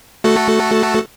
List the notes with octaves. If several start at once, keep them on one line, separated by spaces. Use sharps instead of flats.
A3 F#4 A4